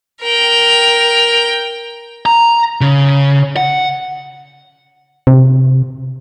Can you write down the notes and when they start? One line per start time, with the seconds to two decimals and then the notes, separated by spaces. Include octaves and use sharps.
0.23 A#4 G5
2.26 A#5
2.81 C#3
3.56 F#5
5.27 C3